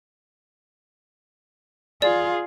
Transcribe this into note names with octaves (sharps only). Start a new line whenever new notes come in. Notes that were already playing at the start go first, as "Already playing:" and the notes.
F4 G#4 D5